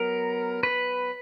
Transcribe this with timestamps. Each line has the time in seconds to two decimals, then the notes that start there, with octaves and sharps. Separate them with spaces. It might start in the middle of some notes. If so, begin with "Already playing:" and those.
Already playing: F#3 B3 A#4
0.63 B4